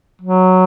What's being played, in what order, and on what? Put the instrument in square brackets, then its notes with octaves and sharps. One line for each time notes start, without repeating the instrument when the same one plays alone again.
[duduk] F#3